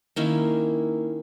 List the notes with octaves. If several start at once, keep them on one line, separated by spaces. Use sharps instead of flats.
D#3 A#3 C#4 E4